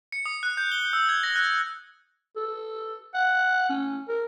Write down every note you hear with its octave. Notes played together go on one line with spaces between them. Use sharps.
C#7
D#6
F#6
G6
G7
E6
G#6
A#6
F#6
A4
F#5
C#4
A#4